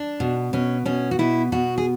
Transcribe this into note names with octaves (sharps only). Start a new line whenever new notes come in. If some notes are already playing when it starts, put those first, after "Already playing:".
Already playing: D4
B2
B2 C#4
B2 C#4
F#4
B2 E4
B2 F#4
G#4